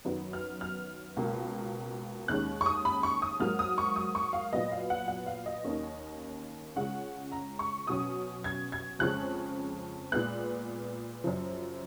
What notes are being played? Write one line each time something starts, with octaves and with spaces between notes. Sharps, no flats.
F#2 D#3 F#3 B3
F6
F6
C#2 B2 A#3
D#2 D#3 G#3 C#4 F#6
C#6
D#6
B5
C#6
D#6
G#2 F#3 A#3 F6
D#6
C#6
D#6
C#6
F5
A#2 F#3 B3 D#5
F5
F#5
F#5
F5
D#5
D#2 D#3 A#3 C#4
C#2 C#3 G#3 C#4 F#5
A#5
C#6
B2 F#3 C#4 D#6
G#6
G#6
F2 C#3 F3 G#3 C#4 F#6
A#2 G#3 B3 F#6
F#2 C#3 F3